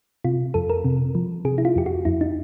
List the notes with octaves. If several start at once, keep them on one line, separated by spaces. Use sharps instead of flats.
C3 F4
F2 A4
A#4
C3
F3
C3 G#4
E4
F4
F2 G4
F#4
F2 E4
D#4